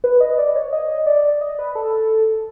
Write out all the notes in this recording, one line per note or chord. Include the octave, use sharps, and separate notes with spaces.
B4
D#5
D5
C#5
D#5
D5
D#5
B4
A4